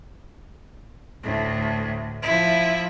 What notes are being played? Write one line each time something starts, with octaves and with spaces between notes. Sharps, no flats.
D2 A2
F3 E4